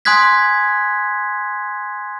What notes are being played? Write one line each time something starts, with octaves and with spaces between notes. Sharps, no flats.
G#5 C6 D#6 F#6 G#6 B6